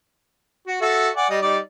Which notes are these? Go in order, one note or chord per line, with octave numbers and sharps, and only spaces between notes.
F#4
F#4 A4 E5
D5 F#5 G#5
G3 D#5
G3 D#4 D5